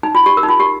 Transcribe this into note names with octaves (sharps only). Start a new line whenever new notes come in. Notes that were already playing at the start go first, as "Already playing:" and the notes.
D#4
F4
G4
A#4
D#4
F4
G4